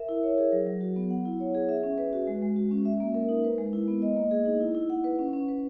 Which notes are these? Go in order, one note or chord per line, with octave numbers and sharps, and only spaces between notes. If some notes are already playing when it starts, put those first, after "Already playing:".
Already playing: A#4 E5
E4
C#5
G#4
F#3
F#3
F#4
B3
F#5
E4
C#5
G#4
E5
C#4
B4
F#4
G#3
G#3
F#4
C#4
E5
A#3
A#4
D#4
B4
G#3
E4
B3
D#5
A#3
G#4
D#4
E4
E4
F#5
B4
C#4
C#4
B4